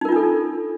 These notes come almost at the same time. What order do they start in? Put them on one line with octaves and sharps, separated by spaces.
D#4 A#4 F4 D4 A4